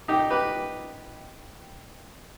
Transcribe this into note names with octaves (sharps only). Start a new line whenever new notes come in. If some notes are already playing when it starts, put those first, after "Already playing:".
D#4 G4
G4 B4